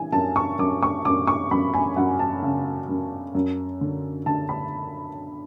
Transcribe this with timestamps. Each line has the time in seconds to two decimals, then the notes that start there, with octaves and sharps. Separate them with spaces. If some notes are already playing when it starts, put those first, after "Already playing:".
Already playing: E3 G#5
0.12 F#2 A5
0.36 C#6
0.59 F#2 D6
0.83 C#6
1.05 F#2 D6
1.27 C#6
1.51 F#2 B5
1.74 G#5
1.96 F#2 F#5
2.19 A5
2.42 C#3
2.89 F#2
3.35 F#2
3.81 D3
4.26 D3 A5
4.49 B5